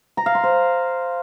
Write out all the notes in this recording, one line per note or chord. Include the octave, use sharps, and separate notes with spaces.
A#5
F5
C6
C5